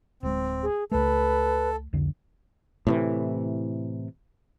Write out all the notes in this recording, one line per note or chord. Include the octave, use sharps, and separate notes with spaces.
D1 G#3 C4
G#4
C#2 A3 A4 B4
C2 F2 D3
A2 C3 E3